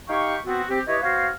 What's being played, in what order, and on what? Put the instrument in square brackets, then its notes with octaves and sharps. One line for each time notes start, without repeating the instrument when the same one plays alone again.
[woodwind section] D#4 G4 F5 G5 C#6
B3 C4 F#4
C4 G4
E4 G4 B4 C#5 D#5
B3 F#4 C5 C#5 F5